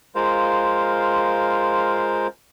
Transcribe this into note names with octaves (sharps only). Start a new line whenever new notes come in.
G#3 F4 A#4 C5 F5